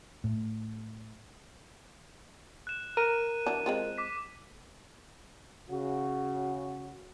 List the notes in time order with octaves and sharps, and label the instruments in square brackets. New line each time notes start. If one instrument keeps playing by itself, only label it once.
[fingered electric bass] A2
[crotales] F#6 E7
[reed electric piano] A#4 [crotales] D#7
[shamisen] E3 F#3 D4
G#3 C4 F4
[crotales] D6 B6
[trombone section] C#3 F#4